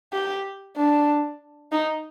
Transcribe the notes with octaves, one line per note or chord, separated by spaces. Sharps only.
G4
D4
D#4